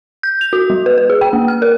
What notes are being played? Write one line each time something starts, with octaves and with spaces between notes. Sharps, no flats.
G6
F7
F#4
G3
B4
B4
G#4
G5
A#3
F6
A#4